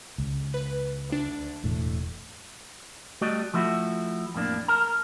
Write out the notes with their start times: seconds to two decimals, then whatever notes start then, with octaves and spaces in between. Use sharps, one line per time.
0.18 C#2
0.54 B4
1.09 D2 D4
1.64 E1 A2
3.21 G3 A3 F#4 D5 D#5
3.54 F3 A3 E4 F#4
4.34 F2 A2 A#3 D4
4.68 A#4 A5 A#5